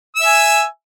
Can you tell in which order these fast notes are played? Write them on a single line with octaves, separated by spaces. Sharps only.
E6 E5 G#5